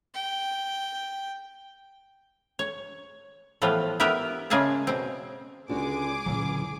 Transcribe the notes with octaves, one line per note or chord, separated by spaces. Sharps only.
G5
C#5
A2 E3 F3 G3 B3 F4
B3 E4 G4 A#4 E5
C#3 G#3 A#3 G#4 E5 A5
B2 C4
C#2 D3 D4 F#4 G#4 D6
C#2 A#2 D3 E3 F#3 C#4